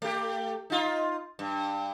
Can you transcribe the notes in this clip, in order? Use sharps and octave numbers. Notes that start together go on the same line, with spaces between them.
A3 G4
D#4 F4
G2